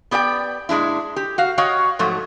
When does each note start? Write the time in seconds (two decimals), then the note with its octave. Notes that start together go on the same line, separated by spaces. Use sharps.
0.11 B3 G4 D5 E5 G5
0.69 A#2 G#3 D4 E4
1.16 G4
1.38 F#4 F5
1.58 F#4 C#5 D#5 F5 G5
1.99 G#2 F3 F#3 A3